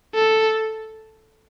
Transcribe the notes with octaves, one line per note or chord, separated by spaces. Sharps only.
A4